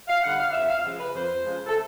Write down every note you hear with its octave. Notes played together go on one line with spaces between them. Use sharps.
F5
D3 G3 F#5
F5
F2 E5
F5
C#3 F3 G#3
B4
F2 C5
C#3 F3 G#3
A4